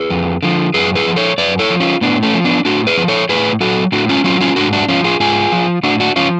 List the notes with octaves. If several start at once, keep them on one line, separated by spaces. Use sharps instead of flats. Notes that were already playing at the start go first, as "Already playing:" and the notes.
Already playing: G#4 B4
F2
D3 F3
F#2 G#4 B4
G#4 B4
F3
A4 C#5
F#2 B4 D5
A4 C#5
F3
C#4 F4
A2 B3 D4
A3 C#4
F3
B3 D4
A2 D4 F#4
G#4 B4
F3
A4 C#5
A2 G#4 B4
F#3 F#4 A4
A2 D4 F#4
C#4 F4
F#3 C#4 F4
C#4 F4
G#2 D4 F#4
D4 F#4
F3 C#4 F4
F4 G#4
G#2 F4 G#4
F3
A2 D4 F#4
D4 F#4
F3 C#4 F4